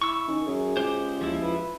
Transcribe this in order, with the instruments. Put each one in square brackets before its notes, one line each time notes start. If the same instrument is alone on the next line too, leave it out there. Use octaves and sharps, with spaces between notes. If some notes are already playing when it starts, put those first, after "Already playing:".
[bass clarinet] E4 [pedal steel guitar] C#6 E6
[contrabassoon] D#3 [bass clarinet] C#4
[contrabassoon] F#2 [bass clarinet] G#4
[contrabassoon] C#2 [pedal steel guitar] G4 C5
[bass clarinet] D#2 [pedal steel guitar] F3 E4
[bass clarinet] B4